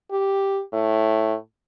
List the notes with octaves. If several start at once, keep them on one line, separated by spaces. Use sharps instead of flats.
G4
A2